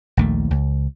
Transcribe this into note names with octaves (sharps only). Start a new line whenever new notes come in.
A#1 D#2 A3
C#2